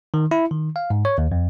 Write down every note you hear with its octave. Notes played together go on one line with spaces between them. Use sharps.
D#3
E4
D#3
F5
G#2
C#5
D#2
F2